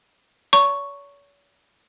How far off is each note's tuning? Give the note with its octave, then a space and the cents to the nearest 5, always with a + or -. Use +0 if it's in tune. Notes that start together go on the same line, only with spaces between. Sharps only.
C#5 +40 A#5 -35 C#6 +0